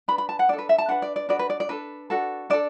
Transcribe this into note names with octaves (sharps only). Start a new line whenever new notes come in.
D4 B4 B5
B5
A5
F#5
D4 A4 D5
B4
E5
A5
D4 B4 F#5
D5
D5
D4 F#4 B4 D5
B4
D5
D5
D4 A4 B4
D4 F#4 A4
D4 A4 D5